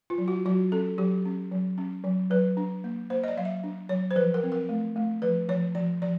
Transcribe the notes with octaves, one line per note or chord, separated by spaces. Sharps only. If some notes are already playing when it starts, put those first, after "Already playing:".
F4
F#3
F#4
F#3 F#4
C#4 A4
F#3 G4
C#4
F#3
C#4
F#3
F#3 B4
D4
A#3
A#3 C5
D#5
D5
F#3 F5
E5
D4
F#3 C#5
C5
F3 B4
A#4
C4
A#4
A3
A3
F3 B4
F3 C#5
F3 D5
F3 D5